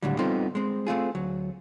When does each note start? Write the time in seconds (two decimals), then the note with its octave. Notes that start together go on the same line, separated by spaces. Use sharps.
0.03 C#2 A2 D3 F#3 G3
0.18 G3 B3 C4 D#4 F4 A4
0.55 G#3 C4
0.87 A3 C4 F4 G#4
1.15 D2 F#3